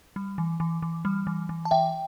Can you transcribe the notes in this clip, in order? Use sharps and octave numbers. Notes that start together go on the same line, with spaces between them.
G3
E3
E3
E3
G3
E3
E3
A5
E3 E5 G5